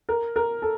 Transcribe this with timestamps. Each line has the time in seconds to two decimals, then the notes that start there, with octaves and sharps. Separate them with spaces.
0.09 A#4
0.36 A#4
0.62 A4